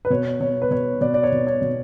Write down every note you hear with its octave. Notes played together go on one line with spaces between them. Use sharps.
B4
B2 C#5
B2 C#5
B4
B2 C#5
B2 D5
D5
C#5
B2
C#5
B2